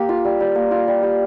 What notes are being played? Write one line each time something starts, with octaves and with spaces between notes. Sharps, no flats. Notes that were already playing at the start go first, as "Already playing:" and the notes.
Already playing: A#3 G4
F4
G3
G3
A#3
F4
G3
G3